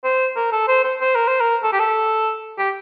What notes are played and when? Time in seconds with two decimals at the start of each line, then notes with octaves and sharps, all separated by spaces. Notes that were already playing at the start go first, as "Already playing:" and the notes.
0.04 C5
0.36 A#4
0.52 A4
0.68 C5
0.84 C5
1.01 C5
1.15 A#4
1.28 C5
1.40 A#4
1.63 A4
1.73 G4
1.80 A4
2.58 G4